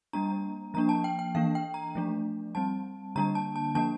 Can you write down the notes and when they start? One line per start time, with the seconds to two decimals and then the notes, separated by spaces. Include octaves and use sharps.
0.13 G3 A#3 D4 A#5
0.74 F3 A#3 D4 A#5
0.89 A5
1.04 G5
1.19 G5
1.35 E3 A#3 D4 F5
1.55 G5
1.74 A#5
1.95 F3 A3 D4
2.55 G3 C4 A5
3.16 D3 G3 A#3 D4 A#5
3.35 A5
3.56 A5
3.75 F3 A#3 D4 A5